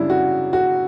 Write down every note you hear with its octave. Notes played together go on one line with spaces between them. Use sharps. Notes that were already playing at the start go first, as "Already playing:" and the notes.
Already playing: F#2 C#3 G3 D4 E4
F#4
F#4